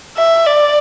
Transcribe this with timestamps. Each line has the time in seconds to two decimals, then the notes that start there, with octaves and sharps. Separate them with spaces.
0.17 E5
0.46 D5